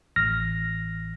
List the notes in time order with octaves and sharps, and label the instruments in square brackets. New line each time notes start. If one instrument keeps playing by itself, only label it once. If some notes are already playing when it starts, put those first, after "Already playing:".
[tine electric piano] A1 F6 A#6